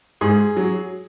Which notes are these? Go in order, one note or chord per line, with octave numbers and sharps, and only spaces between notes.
G#2 G#4
F#3